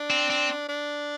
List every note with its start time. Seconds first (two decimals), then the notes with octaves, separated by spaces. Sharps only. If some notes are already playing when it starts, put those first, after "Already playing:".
Already playing: D4
0.10 C4
0.30 C4
0.69 D4